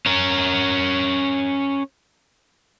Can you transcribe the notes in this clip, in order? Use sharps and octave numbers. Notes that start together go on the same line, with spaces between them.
C#4 A#4